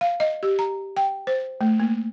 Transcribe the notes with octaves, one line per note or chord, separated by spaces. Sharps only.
F5
D#5
G4
A#5
G5
C5
A3
A#3